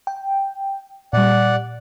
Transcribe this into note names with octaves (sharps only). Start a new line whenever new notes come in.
G5
A#2 G3 D5 F#5